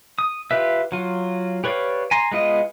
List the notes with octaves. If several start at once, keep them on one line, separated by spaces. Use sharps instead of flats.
D#6
F4 G4 B4 E5
F#3 F4
G4 B4 C#5 D5 F5
G#5 A#5 C6
G#3 B3 F4 D#5